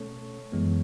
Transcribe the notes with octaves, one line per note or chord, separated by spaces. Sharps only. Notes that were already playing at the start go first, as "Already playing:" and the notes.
Already playing: B2 A3 C#4 A4 C#5
F#2 E3 G#3 B3